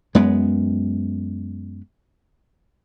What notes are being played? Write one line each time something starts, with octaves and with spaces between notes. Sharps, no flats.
F#2 G#3 B3